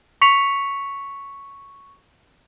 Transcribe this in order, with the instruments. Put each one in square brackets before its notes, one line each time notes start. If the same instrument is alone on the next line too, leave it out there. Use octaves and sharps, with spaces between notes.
[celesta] C#6 B6 C#7 F7